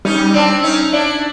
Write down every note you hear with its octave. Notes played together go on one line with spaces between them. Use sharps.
G3 C#4 D#4
C4 D4
C#4 D#4
D4 E4